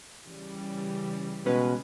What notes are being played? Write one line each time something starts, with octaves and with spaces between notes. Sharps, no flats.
C#3 E3 G3
B2 G#3 C#4 B4